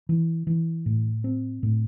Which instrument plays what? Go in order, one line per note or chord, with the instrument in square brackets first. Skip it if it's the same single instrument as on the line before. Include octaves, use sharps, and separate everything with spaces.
[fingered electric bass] E3
E3
A2
C4
A2